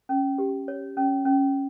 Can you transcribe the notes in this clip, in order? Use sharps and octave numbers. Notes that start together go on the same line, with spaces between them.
C#4
G4
C#5
C#4
C#4